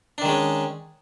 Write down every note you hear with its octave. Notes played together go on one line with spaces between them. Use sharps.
D#3 G#3 C#4 D4